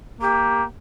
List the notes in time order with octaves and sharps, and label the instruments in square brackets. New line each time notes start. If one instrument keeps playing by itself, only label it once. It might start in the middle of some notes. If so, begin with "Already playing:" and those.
[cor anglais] A#3 [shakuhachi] G4